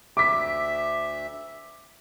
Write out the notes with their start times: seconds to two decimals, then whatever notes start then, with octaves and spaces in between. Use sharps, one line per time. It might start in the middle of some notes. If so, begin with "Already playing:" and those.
0.17 D2 E5 D6 B6